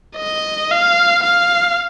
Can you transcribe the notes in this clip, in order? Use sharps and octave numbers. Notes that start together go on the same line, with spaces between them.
D#5
F5
F5